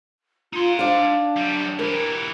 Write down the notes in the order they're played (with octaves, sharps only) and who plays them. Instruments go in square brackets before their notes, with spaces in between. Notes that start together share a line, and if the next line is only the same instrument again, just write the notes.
[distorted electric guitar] D#4 C6 [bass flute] F4
[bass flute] D4 [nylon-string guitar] D5 F5
[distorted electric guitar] F#2 G3
[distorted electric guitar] E3 G4 [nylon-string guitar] A#4